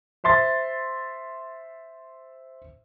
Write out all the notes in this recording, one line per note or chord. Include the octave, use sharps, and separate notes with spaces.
C5 E5 C6 A6